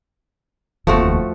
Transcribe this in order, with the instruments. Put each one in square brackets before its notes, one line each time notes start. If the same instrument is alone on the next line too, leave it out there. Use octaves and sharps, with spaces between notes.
[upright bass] F1 D#2 [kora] F3 A3 F#4